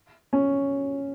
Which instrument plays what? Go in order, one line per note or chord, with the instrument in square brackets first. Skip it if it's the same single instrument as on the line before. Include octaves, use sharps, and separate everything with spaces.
[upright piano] C#4